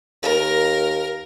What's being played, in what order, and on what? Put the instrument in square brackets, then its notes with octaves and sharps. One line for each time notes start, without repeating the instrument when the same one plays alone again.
[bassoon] D#2 [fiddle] A#4